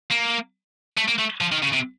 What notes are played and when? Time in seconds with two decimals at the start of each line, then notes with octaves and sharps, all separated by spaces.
0.11 A#3
0.97 A3
1.08 A#3
1.19 A3
1.41 F3
1.52 D#3
1.63 C#3
1.74 C3